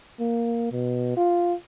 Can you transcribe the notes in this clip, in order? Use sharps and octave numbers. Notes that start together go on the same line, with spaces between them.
A#3
B2
F4